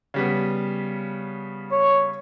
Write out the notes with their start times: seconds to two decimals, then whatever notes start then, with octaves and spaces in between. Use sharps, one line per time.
0.14 C#3 G3 B3
1.72 C#5